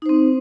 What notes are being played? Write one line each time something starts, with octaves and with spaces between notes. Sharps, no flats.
C4 D#4 C5